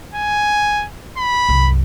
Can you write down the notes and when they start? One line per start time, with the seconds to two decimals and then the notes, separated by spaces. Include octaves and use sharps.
0.14 G#5
1.18 B5
1.49 C2 F#2